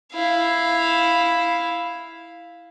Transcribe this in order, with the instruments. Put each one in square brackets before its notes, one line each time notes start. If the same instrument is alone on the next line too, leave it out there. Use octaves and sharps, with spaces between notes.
[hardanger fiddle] E4 F5